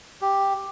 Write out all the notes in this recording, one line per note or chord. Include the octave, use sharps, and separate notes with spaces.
G4